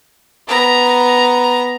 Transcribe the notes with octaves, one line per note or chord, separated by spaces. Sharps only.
B3 A#5